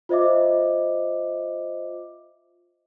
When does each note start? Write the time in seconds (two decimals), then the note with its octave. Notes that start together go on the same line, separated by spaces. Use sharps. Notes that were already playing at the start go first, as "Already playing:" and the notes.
0.09 F4 C5 D#5 E5 D6